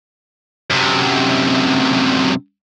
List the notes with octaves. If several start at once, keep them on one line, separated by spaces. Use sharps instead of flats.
F#2 C3